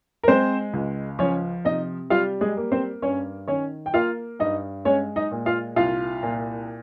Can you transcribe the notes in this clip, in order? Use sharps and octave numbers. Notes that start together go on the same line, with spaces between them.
A#4
G#3 C4 C5
C#2
F3 C#4 C#5
C3 D#4 D#5
G3 F4 F5
G#3 G#4
A#3
C4 C5
G2 C#4 C#5
D#3 C#4 C#5
G5
A#3 F4 F5
G2 D#4 D#5
G#3 C#4 C#5
D#4 D#5
A#2
F4 F5
C2 F4 F5
A#2